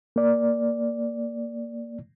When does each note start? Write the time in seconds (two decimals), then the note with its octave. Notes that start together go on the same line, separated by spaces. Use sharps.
0.16 A#3 D5